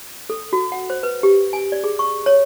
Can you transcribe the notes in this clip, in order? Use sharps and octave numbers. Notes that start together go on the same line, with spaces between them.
A4
F#4
F#5
C5
B4
G4
G#5
D5
G#4
C#6
C#5